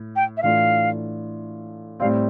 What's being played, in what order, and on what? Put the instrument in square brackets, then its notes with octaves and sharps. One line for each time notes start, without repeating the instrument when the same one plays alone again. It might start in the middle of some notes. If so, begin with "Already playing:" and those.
Already playing: [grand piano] A2
[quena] G5
E5
[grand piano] A2 E3 A3 D4 F4 [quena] F5
[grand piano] A2 G3 C4 [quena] F5